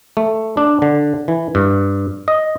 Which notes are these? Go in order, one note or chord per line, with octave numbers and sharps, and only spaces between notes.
A3
D4
D3
E3
G2
D#5